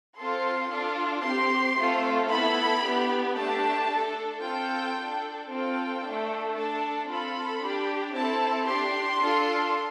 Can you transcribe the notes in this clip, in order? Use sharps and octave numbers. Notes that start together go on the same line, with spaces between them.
C4 F4 A4 C6
D4 F4 A4
C4 G4 C6
A3 C4 F4 A4
B3 E4 A4 B5
B3 D4 G4
A3 D4 G4 A5
D4 A4
C4 F4 A4 G5
D4 A4
C4 F4 A4 G5
A3 D4 A4
D4 A4 A5
C4 F4 A4 B5
D4 G4
C4 E4 A4 A5
D4 G4 C6
D4 F4 A4